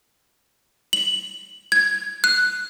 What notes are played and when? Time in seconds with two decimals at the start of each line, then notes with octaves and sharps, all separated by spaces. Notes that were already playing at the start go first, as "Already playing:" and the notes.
0.93 F#7
1.72 G#6
2.24 F#6